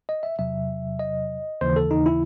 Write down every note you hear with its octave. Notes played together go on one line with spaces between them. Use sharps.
D#5
E5
E2 C3 F#3 E5
D#5
D#2 C#3 E3 C5
A4
D#4
E4